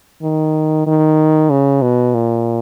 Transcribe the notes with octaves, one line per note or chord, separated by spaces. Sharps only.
D#3
D#3
C#3
B2
A#2